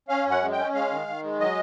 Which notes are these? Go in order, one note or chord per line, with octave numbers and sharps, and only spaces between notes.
C#4 F5
F#2
F#5
G#3
G5
C#4
G#3 F5
D#3
D#3
G#3
F#3 D#5